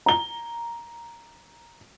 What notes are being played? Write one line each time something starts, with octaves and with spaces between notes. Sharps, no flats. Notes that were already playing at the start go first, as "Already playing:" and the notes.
A#5 G7